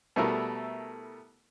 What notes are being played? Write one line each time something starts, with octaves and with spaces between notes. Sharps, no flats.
B2 G3 A3 E4 A4 A#4